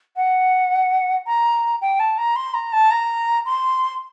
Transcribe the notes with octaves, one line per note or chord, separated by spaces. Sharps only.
F#5
A#5
G5
A5
A#5
C6
A#5
A5
A#5
C6